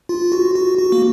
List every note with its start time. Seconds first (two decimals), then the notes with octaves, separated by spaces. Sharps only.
0.09 F4
0.32 F#4
0.55 F#4
0.78 F#4
0.92 A#3